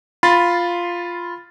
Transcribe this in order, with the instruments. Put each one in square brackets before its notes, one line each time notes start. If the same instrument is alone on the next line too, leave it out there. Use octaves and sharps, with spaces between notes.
[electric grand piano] F4 B5 C6 A6